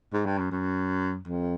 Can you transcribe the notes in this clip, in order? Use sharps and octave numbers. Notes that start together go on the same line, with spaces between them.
G#2
G2
F#2
F#2
F2